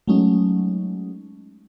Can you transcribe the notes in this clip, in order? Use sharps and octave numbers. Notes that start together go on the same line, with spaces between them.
F#3 G#3 A3 C#4 D#4